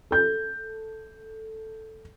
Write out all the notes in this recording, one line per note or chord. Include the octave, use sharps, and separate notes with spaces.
A4 G6